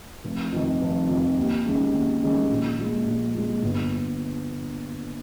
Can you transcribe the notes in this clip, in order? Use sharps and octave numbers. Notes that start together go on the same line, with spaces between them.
F1
F2 D#3
F1
F2 D#3
D#2
D#3 G#3 C#4
D#2
D#3 G#3 C#4
A#1
A#2 G#3
A#1
A#2 G#3
G1